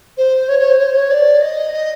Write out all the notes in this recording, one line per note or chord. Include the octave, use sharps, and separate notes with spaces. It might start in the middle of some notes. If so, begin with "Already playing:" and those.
C5
C#5
C#5
C5
C#5
C5
C#5
D5
D#5
D#5